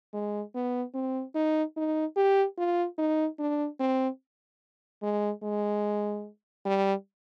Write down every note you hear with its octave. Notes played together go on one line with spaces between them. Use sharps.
G#3
B3
C4
D#4
D#4
G4
F4
D#4
D4
C4
G#3
G#3
G3